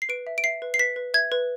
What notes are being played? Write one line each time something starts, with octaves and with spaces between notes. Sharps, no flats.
C7
B4 D7
E5
D7
E5 C7
B4
C7
B4 B6
B4
E5 G#6
B4